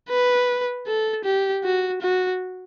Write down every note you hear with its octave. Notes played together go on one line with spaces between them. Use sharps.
B4
A4
G4
F#4
F#4